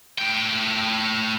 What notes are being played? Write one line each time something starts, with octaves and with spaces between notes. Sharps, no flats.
A2 G5